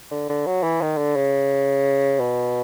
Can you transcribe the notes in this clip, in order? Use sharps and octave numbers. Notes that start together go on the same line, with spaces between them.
D3
D3
F#3
E3
D#3
D3
C#3
B2